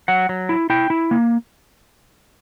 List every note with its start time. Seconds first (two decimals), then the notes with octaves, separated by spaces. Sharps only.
0.08 F#3 F#5
0.29 F#3
0.49 E4
0.70 E4 G5
0.90 E4
1.11 A#3